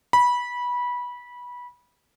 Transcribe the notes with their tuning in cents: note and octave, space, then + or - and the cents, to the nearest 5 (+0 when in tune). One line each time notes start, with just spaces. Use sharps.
B5 -20